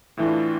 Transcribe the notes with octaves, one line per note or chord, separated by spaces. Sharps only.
A2 E3 A3 D4 F4